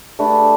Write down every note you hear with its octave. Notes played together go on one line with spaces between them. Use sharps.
A3 D4 G4 B4